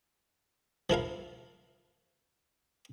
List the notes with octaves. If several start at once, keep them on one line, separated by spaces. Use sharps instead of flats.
F3 E4 A#4 F5